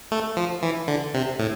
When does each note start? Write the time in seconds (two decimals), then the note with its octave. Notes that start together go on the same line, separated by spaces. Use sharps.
0.12 A3
0.37 F3
0.62 E3
0.88 D3
1.14 C3
1.39 A2